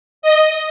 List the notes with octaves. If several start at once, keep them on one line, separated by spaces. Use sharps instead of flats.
D#5